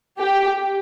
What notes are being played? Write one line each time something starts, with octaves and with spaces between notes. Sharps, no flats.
G4